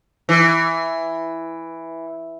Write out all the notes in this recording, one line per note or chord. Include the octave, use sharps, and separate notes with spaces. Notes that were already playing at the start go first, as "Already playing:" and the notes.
E3